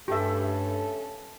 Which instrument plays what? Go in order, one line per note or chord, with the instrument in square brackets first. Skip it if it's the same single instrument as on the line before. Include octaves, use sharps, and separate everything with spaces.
[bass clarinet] G2 [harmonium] A3 C#4 A4 [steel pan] G4 E5